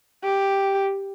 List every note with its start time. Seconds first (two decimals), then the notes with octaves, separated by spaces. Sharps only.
0.24 G4